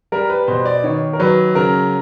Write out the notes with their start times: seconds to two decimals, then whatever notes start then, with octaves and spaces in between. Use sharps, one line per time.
0.12 G3 A#4
0.30 B4
0.48 B2 C5
0.66 D5
0.84 D#3 C#5
1.13 A#4
1.20 F#3 B4
1.55 C#3 A#4